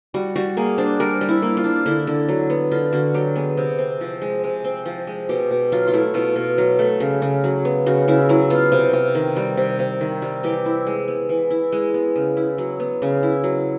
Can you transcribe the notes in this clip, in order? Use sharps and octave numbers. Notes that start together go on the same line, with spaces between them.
G3 F#4
G3 F#4
A#3 G#4
D4 C5
G3 A#4
G3
E4
A#3
F4
D4
D3 E4
D3
F#3
B3
D3 F4
D3 F#4
F#3 G4
B3 G#4
C3
C4
F3
G#3
C3
C4
F3
G#3
B2 G4
B2
F#3 F4
F4
A3 E4
B2 F4
B2
F#3
A3
C#3
C#3
F#3
B3
C#3 F#4
C#3 E4
F#3 E4
B3 F4
C3
C3
D#3
G3
C3
C3
D#3
G3
E3 G4
E4
G#3
B3
E3
E4
G#3
B3
C#3
E4
F#3
B3
C#3
E4
F#3